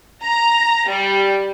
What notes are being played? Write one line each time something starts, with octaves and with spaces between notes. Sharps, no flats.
A#5
G3